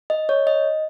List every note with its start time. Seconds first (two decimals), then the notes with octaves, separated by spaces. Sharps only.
0.10 D#5
0.29 C#5
0.47 D#5